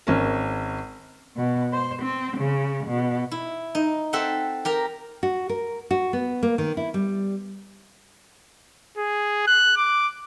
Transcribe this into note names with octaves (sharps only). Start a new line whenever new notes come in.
G#1 C#4 A#4
B2
C5
C4
C#3
B2
E4
D#4
C4 A4 E5 F#5 G5
G4 A#4 A#5
F#4
A#4
F#4
B3
A#3
D#3
E4
G3
G#4
F#6
D6